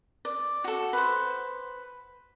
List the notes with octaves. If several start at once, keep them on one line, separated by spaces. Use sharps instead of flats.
D5
F#4 A4
B4 C5